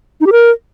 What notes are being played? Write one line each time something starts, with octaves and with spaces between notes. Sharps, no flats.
D#4
G4
A#4